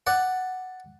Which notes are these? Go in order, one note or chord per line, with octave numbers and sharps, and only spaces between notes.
D5 F#5